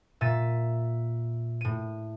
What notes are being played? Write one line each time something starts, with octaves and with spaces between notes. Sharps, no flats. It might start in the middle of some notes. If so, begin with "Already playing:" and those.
A#2 E5 A6 D#7
A2 D#7